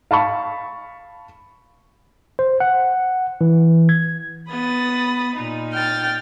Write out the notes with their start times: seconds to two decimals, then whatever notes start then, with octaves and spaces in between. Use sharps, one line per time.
0.11 F5 A5 B5 C#6
2.39 C5
2.60 F#5
3.41 E3
3.89 G#6
4.50 B3 B5 D#6 A6
5.35 A#2 D#4
5.73 G5 F6 A6